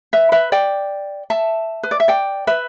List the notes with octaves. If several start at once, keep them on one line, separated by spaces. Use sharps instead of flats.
B4 E5
B4 E5
D5 G5
E5 A5
B4
D5
E5
D5 G5
B4 E5